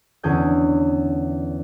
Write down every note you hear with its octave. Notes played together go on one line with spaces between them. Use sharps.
E2 D3 C#4 G#4 G#5 G6